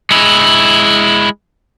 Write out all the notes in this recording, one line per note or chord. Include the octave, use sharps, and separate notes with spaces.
G#3 E4